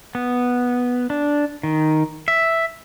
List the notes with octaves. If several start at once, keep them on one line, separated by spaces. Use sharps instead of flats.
B3
D4
D#3
E5